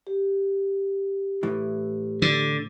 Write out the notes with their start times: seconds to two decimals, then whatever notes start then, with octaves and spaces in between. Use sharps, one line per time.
0.07 G4
1.43 A2 E3
2.22 D3